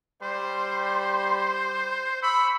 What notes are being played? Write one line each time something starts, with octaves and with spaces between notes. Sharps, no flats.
G3 C5 C6
B5 C#6 E6